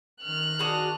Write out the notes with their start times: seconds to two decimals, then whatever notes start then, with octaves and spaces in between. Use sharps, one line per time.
0.22 D#3 F6 F#6
0.59 D4 F#4 G#4